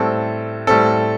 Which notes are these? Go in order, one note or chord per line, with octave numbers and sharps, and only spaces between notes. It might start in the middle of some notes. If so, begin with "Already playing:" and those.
Already playing: A2 G3 C4 A4
A2 G3 C4 A4